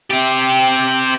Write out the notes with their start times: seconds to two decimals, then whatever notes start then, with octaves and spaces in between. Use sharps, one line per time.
0.10 C4 G4